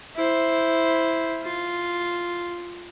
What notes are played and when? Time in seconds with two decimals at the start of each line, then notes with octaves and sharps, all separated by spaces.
0.16 E4 C5
1.43 F4